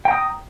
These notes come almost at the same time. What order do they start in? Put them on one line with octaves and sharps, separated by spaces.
G5 A#5 D#6